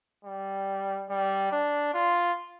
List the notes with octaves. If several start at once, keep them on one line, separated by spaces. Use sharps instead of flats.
G3
G3
D4
F4